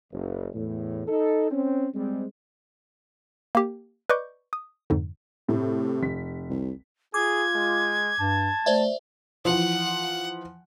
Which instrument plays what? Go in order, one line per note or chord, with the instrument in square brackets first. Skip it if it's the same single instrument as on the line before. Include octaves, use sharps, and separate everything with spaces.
[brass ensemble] F#1
E2 A2
D#4 A4
C4 C#4
G3 G#3 C4
[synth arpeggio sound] A#3 G4
B4 D5 D#5 C#6 D6 G6
D#6
F2 G#2 D3
[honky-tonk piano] A2 [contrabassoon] C3
[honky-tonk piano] F1 B6
[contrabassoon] C2
[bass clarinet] F4 [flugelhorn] G#4 [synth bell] D6 [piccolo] G#6
[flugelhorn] G#3
[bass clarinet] G2 [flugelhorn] A5
[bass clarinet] A3 [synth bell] C5 D5 E5
[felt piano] E3 F3 [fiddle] F#5